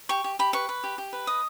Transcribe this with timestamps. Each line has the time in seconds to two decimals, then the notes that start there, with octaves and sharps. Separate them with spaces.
0.09 G4 C#6
0.24 G4
0.39 G4 B5
0.53 B4 C#6
0.69 B4
0.84 G4
0.98 G4
1.13 B4
1.27 D#5 D#6